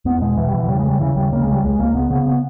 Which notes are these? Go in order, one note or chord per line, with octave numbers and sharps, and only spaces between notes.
E2 B3
B2 G#3
B2 E3
G3
E2 E3
E3
C#3 G3
G#3
D#2
G3
C#3 E3
D#2 G3
C#3 A#3
G#3
C#2
G3
C#2 G#3
C#2 A#3
C#3 B3
C#3 B3
B3